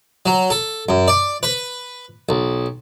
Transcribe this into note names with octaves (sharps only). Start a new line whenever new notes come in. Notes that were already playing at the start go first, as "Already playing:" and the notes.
F#3
A4
F#2
D5
B4
B1